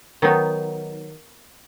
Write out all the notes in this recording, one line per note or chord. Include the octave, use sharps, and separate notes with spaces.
D#3 F#3 B3 D#4